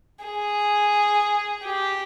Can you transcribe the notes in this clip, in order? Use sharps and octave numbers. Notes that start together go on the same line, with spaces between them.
G#4
G4